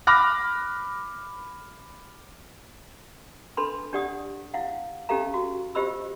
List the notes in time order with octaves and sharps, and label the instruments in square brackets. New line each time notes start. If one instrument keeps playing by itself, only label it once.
[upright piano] B5 D6 F6 F#6 A#6
[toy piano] D4 A4 B4 B5 C6
D4 G4 D5 F#5 D#6
E4 F5 F#5
C#4 D#4 G4 A4 F5 A#5
F#4
F4 G4 C5 D#5 B5 E6